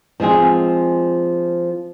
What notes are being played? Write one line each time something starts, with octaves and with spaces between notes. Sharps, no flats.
F3 G#3 C4 G#4